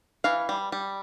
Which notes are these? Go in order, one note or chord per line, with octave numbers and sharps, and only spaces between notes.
E3 F5
G3
G3